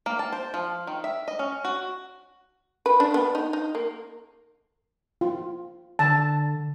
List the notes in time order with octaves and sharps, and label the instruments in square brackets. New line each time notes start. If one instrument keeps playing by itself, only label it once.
[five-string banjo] A#3
A5
C5
F3
D#3
E5
D#5
C#4
F#4
[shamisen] B4
D4
B3
D#4
D#4
A#3
[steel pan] F4
[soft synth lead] D3 [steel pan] A5